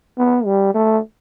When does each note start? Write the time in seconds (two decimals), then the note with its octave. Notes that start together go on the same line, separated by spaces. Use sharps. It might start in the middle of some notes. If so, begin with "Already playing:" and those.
0.18 B3
0.45 G3
0.74 A3